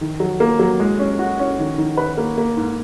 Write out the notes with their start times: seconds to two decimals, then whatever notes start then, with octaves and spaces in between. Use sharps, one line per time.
0.01 D#3
0.20 F#3
0.40 A#3
0.59 F#3
0.80 G#3
0.99 C#4
1.19 F#4
1.39 C#4
1.59 D#3
1.78 D#3
1.97 B4
2.17 A#3
2.38 A#3
2.57 G#2